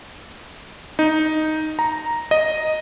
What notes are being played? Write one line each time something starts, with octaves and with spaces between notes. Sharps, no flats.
D#4
A#5
D#5